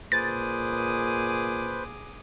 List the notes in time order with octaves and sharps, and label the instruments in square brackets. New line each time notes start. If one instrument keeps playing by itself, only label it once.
[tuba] A#2 [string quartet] G#4 D6 D#6 [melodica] B4 C5 [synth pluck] A6